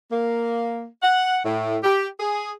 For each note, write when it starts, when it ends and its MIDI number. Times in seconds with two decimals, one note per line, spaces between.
0.10 0.83 58
1.02 1.39 78
1.44 1.77 45
1.83 2.06 67
2.19 2.50 68